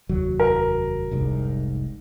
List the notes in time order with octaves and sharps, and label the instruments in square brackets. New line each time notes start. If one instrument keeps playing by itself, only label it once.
[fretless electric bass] F1 D#2 F#3
[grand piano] A#4
[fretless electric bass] F1 C2 G#2